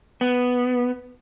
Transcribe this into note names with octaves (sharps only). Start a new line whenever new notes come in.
B3